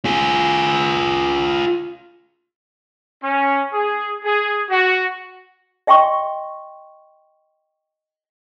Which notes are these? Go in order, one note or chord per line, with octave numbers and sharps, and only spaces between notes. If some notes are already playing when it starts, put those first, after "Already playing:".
F4 G#4
C#4
G#4
G#4
F#4
D#5 E5 G5 C6 C#6